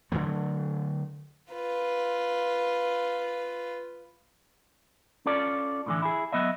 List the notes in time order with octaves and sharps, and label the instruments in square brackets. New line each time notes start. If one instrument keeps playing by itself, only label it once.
[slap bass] D3 D#3 F#3 A3
[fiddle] F4 B4
[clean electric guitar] C#4 F4 A4 D5
A2 D3 E3
E4 G#4
F#3 B3 D#5 E5